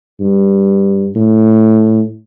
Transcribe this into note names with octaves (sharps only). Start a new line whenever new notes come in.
G2
A2